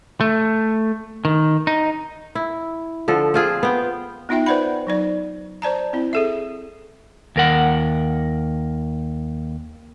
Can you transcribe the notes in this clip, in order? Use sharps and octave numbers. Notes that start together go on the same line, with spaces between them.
A3
D#3
D#4
E4
D3 F3 A4
C4 F4 G#4
B3 G5
B3 D#4 F4 E5 G5
B4 C5 D5 F#5 B5
F#3 D#4 D5
C5 D5 A5 A#5
C4 E4
G#4 A4 E5
D#2 A#4 F#5